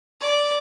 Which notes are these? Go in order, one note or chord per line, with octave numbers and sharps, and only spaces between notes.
D5